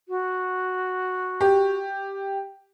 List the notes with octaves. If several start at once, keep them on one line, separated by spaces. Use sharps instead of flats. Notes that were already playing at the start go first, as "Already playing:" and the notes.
F#4
G4